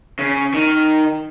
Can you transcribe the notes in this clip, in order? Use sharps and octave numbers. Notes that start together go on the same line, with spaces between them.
C#3
D#3